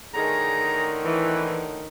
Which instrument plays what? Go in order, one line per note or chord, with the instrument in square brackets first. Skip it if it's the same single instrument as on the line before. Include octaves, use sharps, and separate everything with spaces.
[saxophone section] A2 D3 D#3 [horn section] G#4 A#5
[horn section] E3